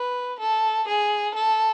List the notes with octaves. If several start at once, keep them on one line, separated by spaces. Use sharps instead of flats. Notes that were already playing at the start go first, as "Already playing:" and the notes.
Already playing: B4
A4
G#4
A4